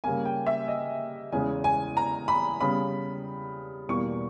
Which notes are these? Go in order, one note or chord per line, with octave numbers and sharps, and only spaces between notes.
C#3 G3 A#3 G#5
G5
E5
D#5
E2 C#3 G#3 G#5
G#5
A#5
B5
C#3 G3 B3 B5
E2 B2 G3 A#3 C#6